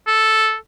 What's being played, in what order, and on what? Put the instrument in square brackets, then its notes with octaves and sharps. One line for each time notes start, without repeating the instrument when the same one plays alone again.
[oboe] A4